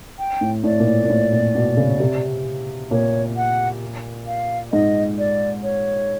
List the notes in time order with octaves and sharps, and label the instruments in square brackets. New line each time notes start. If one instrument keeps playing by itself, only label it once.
[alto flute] G5
[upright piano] A2
[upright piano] A2 [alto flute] D5
[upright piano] A#2
A2
A#2
A2
A#2
B2
C#3
C3
[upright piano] A#2 [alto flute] C#5
[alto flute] F#5
F5
[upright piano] G#2 [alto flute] D#5
[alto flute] D5
C#5